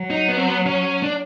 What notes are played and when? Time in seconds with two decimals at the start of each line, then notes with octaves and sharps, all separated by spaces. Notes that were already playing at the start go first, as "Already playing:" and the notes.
Already playing: F#3
0.10 D#4
0.28 B3
0.37 C4
0.48 B3
0.66 C#4
1.03 D4